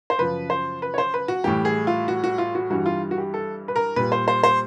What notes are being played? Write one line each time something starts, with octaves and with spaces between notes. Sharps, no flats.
C5
F#2 C#3 F3 B4
C5
B4
C#5
C5
B4
F#4
A2 E3 G3 G4
G#4
F4
F#4
F#4
F4
F#4
G2 E3 G3 F#4
F4
F#4
G4
A4
B4
A#4
A#2 G3 B4
C5
C5
C5